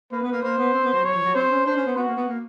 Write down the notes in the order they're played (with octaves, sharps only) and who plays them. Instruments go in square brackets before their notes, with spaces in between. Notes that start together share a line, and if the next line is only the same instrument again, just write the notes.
[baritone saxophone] A#3 [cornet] B4
[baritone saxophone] B3
A#3
[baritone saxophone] A#3 [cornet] C5
[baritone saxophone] B3
C4
B3
F#3
[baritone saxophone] F#3 [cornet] C#5
[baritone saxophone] F3
F#3
[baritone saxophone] C4 [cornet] C5
[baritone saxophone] C#4
[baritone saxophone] D4 [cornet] C5
[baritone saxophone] C#4
B3
[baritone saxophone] B3 [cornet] F#4
[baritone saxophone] A#3
B3
A#3